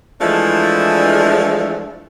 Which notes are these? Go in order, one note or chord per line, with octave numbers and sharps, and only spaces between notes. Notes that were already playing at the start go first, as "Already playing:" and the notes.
E3 F3 G#3 A3 D4 E4